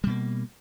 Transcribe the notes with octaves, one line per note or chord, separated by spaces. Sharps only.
B2 G3 A#3